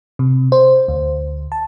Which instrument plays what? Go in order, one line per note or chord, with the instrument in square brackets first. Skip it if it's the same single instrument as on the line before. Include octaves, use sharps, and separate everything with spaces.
[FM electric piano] C3
C5
D2
A5